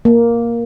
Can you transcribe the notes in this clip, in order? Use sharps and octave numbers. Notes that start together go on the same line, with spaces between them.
A#3